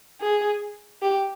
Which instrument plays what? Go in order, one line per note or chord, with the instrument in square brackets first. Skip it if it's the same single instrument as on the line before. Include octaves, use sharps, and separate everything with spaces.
[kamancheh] G#4
G4